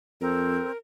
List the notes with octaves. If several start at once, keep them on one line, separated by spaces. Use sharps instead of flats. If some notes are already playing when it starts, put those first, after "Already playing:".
F2 C4 A4 A#4